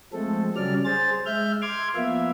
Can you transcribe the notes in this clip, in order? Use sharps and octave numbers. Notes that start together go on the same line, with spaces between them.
F3 G#3 A3 C4 A4
C#3 F#3 G3 C#4 D5 F6
G#4 C5 A6
G#3 E5 F6 G6
C6 D6 F6 G#6
F3 A#3 B3 F4 E5